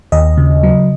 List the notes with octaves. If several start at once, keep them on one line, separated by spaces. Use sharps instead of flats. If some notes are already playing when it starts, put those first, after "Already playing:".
D#2 D#5
C#3
F#3